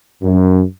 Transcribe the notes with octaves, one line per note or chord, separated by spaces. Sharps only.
F#2